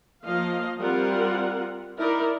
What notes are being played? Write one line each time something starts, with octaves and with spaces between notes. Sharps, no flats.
F3 A#3 D#5 F5
G3 C4 F4 A#4 F#5
D#4 E4 A#4 D5 E5